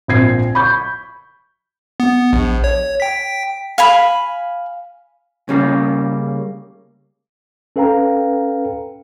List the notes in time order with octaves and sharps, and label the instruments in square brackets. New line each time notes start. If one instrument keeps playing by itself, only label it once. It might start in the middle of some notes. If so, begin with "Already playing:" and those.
[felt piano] A#1 C4 G#6 C7
B5 C#6 G6
[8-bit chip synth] B3
A#1
C#5
G5 B6
[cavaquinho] F5 G#5 B5
[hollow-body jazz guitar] C#3 G3 A#3
[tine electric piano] C#4 A4 B4 F5 G5 A#5